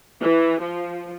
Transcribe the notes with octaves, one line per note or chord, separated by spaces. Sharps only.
E3
F3